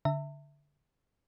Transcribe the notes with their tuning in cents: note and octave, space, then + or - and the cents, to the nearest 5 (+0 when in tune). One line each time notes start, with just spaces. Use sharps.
D3 -20 E5 +5 A#5 -45